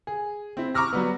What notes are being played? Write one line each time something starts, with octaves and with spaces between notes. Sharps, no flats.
G#4
C4 E4
A#5 C#6 D6 E6 F6 A#6
F#3 G3 B3